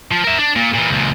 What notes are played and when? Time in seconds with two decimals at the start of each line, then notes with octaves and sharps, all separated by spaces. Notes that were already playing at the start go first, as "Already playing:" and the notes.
0.11 F3
0.24 A#4 E5
0.38 D4
0.56 A#2
0.73 A#2 E3
0.90 C#2 A#2